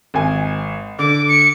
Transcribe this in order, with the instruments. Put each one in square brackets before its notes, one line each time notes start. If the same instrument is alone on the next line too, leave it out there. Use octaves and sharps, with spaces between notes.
[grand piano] G#1 G#5
[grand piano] D3 [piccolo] D6
[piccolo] C#7